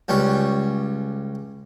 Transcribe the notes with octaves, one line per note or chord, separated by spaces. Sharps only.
C#2 G3 C#4